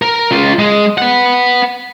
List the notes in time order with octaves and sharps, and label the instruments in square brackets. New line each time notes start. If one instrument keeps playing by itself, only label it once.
[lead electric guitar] A#4
C#2 F4
G#3
B4 F#5